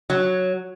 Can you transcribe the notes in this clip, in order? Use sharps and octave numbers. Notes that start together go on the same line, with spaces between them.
F#3